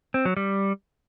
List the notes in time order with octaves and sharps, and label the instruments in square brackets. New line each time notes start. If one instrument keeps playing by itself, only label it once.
[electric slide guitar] C4
F#3
G3